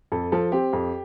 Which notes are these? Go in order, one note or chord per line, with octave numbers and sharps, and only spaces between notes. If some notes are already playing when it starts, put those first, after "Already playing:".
F2 A4
F3 A4
C4 G4
F2